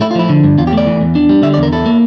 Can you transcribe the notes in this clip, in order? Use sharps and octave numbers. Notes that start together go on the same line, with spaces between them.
A3 E4
F4
F3 E4
D3
G2
E2 F4
G4
A3 D5
E3
E2
D4
G3
D3 E5
D5
E2
A#4
E4 A4
A#3